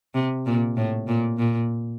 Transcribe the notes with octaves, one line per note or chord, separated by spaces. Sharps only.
C3
A#2
A2
A#2
A#2